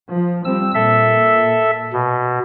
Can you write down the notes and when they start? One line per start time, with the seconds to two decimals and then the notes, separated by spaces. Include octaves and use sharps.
0.12 F3
0.45 F3 G3 C4 E6
0.75 A#2 A4 E5
1.93 B2